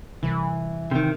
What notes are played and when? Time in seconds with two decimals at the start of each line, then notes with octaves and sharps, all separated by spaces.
0.23 C2 E3
0.91 C3 D#3